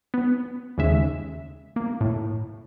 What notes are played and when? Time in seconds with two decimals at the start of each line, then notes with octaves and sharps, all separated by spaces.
0.14 B3
0.78 D#2 C#3 G#3 E5
1.76 A#3
2.01 A2